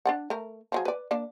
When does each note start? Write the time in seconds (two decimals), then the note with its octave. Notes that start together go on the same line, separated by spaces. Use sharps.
0.06 D4 D5 F#5
0.30 A3 A#4
0.72 F3 F#3 G#4
0.85 B4 D5
1.11 A#3 D4 D5